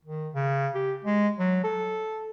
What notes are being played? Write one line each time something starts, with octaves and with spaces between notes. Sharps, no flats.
D#3
C#3
G4
G#3
F#3
A4